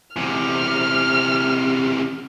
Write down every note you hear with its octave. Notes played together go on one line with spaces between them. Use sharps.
E2 C3 F6